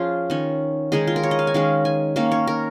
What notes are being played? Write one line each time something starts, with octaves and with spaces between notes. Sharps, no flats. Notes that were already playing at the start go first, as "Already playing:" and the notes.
Already playing: F3 C#4 F4 G#4
D#3 C#4
D#3 G#3 D#4 G#4
F4
A#4
C#5
D#5
F5
G#5
D#3 G#3 C#4 F5
G#5
D#3 A#3 C#4 F5
C#5
A#4